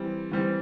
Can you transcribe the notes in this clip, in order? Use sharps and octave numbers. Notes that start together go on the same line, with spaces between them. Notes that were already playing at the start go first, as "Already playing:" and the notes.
Already playing: E3 G3 C4
E3 G3 C4